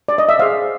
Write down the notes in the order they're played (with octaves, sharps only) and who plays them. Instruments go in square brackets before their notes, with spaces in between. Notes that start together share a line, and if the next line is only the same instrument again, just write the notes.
[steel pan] D5
D#5
E5
G#4 C5 F5